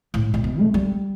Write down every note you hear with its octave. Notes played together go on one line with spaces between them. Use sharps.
A2
A2
B2
A3
G3